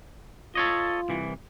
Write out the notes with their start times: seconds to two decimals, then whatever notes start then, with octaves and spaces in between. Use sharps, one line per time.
0.55 F4 A4 C#5 D#5
1.09 C2 E3